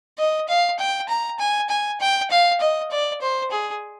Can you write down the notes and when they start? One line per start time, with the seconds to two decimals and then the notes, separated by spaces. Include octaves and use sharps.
0.18 D#5
0.48 F5
0.79 G5
1.09 A#5
1.39 G#5
1.69 G#5
2.01 G5
2.31 F5
2.61 D#5
2.91 D5
3.21 C5
3.51 G#4